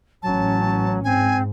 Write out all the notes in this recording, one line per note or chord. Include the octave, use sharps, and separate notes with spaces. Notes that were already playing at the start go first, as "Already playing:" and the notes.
A1 F#3 C#4 A5
G#2 C4 G#5